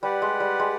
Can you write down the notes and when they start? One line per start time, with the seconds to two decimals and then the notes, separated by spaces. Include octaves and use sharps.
0.03 G3 G4 B4 D5 F#5
0.22 G#3
0.40 G3
0.60 G#3